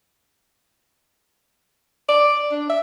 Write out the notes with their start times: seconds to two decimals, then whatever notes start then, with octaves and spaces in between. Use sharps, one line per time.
2.09 D5
2.51 D4
2.69 E5